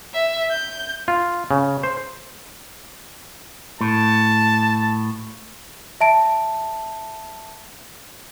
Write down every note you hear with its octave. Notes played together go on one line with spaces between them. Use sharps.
E5
G6
F4
C#3
C5
A2 A5
E5 A5 D7